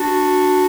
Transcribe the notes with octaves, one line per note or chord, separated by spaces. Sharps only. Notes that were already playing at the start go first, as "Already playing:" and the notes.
Already playing: D4 F#4